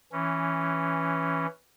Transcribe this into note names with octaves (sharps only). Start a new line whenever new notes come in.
E3 C#4